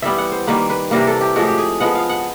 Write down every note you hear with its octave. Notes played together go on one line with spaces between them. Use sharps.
E3 G3 B3 E5
F#5
C5
D#3 G3 A#3 B4
B4
C3 E3 G3 A#3 A#4
A4
G4
A2 F3 G#3 F#4
G4
G#4
F3 G#3 B3 F#5
F5
F#5